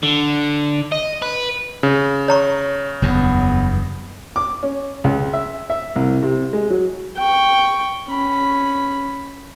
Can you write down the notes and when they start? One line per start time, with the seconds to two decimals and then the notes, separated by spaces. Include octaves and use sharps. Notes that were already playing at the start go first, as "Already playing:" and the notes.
0.03 D3
0.92 D#5
1.22 B4
1.83 C#3
2.28 C#5 A#5 C#6
3.02 F#1 E2 G2 B3
4.36 D6
4.63 C#4
5.04 C#2
5.33 E5
5.70 E5
5.96 C2
6.23 C3
6.53 G#3
6.70 F#3
7.17 G5 C#6
8.09 C#4 B5